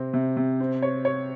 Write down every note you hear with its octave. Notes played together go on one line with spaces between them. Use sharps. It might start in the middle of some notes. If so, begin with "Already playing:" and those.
Already playing: C3 C4
C3
C3
C4
C#5
C#5